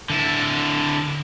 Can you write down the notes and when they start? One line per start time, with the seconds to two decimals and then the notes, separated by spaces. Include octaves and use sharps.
0.10 D3 E4